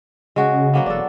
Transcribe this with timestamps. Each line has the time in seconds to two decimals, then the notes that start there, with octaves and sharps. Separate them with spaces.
0.36 C#3 G#3 F#4
0.74 F#3 A#3 B3
0.86 E1 D4 A4